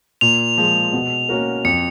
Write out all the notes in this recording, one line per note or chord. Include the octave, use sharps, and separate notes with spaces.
A#2 F7
F3 G#3
B2
A#3 C#4 F#4 A#4
F2 C#7